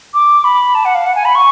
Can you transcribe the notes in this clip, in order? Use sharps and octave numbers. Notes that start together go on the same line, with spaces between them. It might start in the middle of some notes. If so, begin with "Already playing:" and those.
D6
B5
A5
F#5
F5
F#5
G#5
B5
C#6